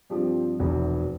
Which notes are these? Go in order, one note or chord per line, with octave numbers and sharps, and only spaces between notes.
G2 F3 C4 G4
F1 E2 B2